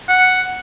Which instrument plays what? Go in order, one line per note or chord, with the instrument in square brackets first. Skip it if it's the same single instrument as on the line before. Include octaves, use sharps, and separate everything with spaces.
[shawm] F#5